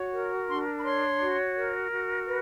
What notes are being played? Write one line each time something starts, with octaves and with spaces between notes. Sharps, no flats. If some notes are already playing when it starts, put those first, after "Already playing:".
Already playing: F#4 C#5
A#4
D4 C6
B5
C#5 C6
F#4
A#4
F#4
B4